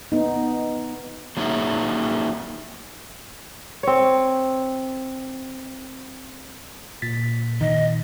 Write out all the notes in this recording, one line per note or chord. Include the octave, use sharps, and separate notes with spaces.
B3 D#4
F#3 A#3 C#4 D#4 G#4 E5
C4 C#5
A#2 A6 B6
D#3 D#5